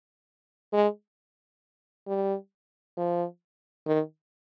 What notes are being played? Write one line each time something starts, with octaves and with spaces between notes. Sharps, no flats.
G#3
G3
F3
D#3